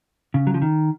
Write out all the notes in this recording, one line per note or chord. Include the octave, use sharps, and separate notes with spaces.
C#3
F#3
F3
D#3